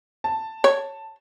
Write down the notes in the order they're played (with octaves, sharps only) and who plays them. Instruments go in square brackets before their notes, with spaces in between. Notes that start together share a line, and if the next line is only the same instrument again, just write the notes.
[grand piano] A5
[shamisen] C#5